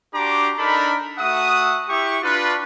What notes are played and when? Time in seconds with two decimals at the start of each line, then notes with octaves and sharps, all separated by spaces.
0.14 D4 F#4 G4 A#5 C6 D6
0.58 D4 D#4 A4 A#4 B5
1.19 A3 F#4 E5 F#5 D#6
1.89 E4 G4 C#6
2.22 D4 F4 B4